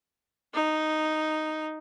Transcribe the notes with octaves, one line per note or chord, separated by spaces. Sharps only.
D#4